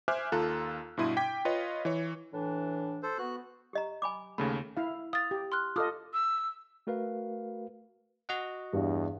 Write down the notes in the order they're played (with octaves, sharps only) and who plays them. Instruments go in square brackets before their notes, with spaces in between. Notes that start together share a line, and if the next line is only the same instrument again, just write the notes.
[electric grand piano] C5 E5 G#5 D6 F6 F#6
D#2 F4 A4 A#5 E6 F#6
G2 B2 E4 C6 D#7
G5 D6 G#6 B6
F4 B4 C#5 D#5 F5
E3 C#5
[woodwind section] A2 E3 D4
[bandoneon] A4 C5
[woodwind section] B3 [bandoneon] F#4 F#6
[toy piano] G4 D#5 A#5
G#5 B5 D6
[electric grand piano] D#2 C#3 A3 [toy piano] B5
[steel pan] E4 F5
[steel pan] F5 [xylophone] D#6 A6
[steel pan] G4
[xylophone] C6 F6 F#6
[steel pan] F4 A4 D#5 [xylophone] D6 D#6 F6
[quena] E6
[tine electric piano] A3 F#4 A#4 B4 F5
F#4 D#5 F#5
[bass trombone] E2 [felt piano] G2